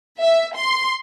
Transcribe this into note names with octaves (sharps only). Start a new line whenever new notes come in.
E5
C6